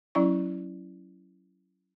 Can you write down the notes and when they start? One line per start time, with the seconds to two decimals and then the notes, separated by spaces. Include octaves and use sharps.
0.15 F#3 C#4 E4 D5 C#6